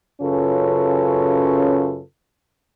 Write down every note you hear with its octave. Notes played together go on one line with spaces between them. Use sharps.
F#2 C#3 C#4 F4 A4 B4